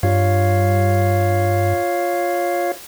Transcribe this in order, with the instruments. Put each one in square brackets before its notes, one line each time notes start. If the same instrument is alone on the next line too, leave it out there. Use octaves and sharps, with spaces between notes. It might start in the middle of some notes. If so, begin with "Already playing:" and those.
[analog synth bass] G2 [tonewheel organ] F4 C#5 F5